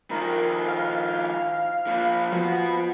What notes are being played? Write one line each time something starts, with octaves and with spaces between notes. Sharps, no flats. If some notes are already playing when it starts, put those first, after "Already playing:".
D#3 F3 A#4
F5
A#2 F3
F3 B3 F#4